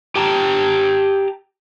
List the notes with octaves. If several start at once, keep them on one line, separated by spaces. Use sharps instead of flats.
G4 G5 A5 A#5